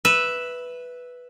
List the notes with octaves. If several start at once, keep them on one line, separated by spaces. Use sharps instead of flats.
B4 E5